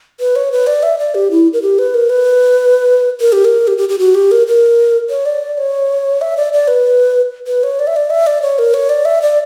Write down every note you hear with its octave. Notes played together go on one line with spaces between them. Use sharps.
B4
C#5
B4
D5
E5
D5
G4
E4
A#4
G4
B4
A#4
B4
A#4
G4
A#4
G4
G4
G4
F#4
G4
A#4
A#4
C#5
D5
C#5
E5
D5
D5
B4
B4
C#5
D5
E5
D5
E5
D5
C#5
A#4
C#5
D5
E5
D5